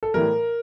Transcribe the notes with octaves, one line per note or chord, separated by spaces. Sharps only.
A4
A2 E3 G3 A#4